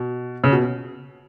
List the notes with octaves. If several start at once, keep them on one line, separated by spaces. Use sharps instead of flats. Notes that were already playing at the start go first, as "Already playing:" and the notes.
Already playing: B2
C#3
B2